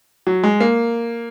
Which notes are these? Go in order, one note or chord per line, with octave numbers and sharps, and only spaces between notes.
F#3
G#3
A#3